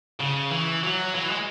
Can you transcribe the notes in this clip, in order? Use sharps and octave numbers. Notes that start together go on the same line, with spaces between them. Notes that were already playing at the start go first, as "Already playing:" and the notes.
C#3
E3
F#3
E3
G#3